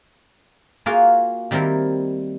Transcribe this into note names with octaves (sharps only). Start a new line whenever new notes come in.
A#3 F4 F#4 G#4 A#4
D#3 G3 C4 E4 A#4